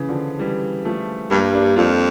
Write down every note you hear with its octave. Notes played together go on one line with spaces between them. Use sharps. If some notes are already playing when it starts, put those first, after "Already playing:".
Already playing: C#3 E3
D3 F3
E3 G3
F3 A3
G2 G3 A#3
A#3 D4
F2 D4 F4